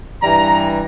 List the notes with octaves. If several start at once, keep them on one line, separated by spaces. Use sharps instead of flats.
G2 E3 G3 A#5